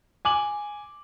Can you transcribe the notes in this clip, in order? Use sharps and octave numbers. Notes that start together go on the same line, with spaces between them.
G#5 D6 F#7